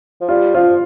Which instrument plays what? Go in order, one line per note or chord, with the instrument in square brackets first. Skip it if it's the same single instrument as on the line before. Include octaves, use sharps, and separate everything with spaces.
[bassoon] F3
[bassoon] G3 [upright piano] F4
[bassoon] F3 [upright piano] F4